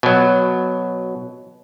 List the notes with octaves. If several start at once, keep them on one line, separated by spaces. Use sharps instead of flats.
B2 F#3